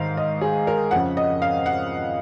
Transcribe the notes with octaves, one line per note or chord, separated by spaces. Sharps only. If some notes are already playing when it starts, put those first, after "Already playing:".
Already playing: G#2 D#3 F5
D#5
G#4
A#4
F2 C#3 F#5
D#5
F5
F#5